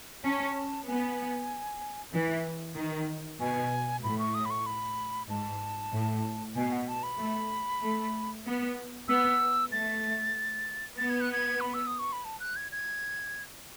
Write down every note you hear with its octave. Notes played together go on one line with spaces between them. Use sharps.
C#4 A5
B3 G#5
E3
D#3
B2 G#5
A2 B5
C#6
D#6
B5
C#6
B5
G#2 A5
A2
B2 G#5
F#5
A5
B5
A3
A3
B3
B3 E6
A3 A6
B3 A6
G#6
F#6
G#6
B5
E6
D#6
C#6
B5
A5
F#6
G#6
G#6